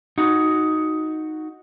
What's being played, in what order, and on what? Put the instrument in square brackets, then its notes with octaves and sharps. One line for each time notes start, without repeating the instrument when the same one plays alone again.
[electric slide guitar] D#4 F#4